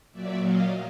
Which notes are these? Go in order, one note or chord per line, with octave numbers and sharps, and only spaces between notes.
A#2 F#3 D5 E5
D#5 F5